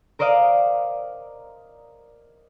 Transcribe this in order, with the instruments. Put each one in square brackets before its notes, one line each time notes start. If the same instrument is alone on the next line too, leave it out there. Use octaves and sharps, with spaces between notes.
[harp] A#4 C5 D5 D#5 F5